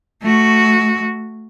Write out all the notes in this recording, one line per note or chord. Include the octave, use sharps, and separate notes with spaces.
A3 F#4